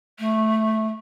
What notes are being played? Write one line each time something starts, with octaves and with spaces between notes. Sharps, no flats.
A3